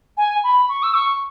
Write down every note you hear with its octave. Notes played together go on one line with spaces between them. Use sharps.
G#5
B5
C#6
E6
C#6